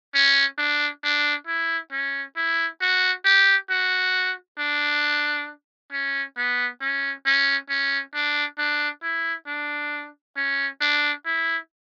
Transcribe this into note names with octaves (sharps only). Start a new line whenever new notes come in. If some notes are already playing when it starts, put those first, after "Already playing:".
C#4
D4
D4
E4
C#4
E4
F#4
G4
F#4
D4
C#4
B3
C#4
C#4
C#4
D4
D4
E4
D4
C#4
D4
E4